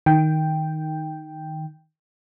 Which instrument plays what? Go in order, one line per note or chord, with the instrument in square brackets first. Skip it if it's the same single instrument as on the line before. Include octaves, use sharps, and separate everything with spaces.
[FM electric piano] D#3 G5